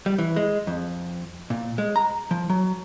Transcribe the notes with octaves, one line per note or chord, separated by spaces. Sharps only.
G3
E3
G#3
F2
A#2
G#3
A#5
F3
F#3